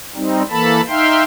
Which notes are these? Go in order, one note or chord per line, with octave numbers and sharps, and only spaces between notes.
G3 C4 D#4
E3 A#3 A4 A5 B5
D#4 E5 F5 G5 C6